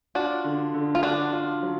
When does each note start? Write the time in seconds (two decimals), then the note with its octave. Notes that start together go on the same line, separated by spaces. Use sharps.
0.15 D4 F4 F#4
0.44 D3
0.74 D3
0.95 F4
1.03 D3 D4 F#4
1.33 F4
1.63 F#3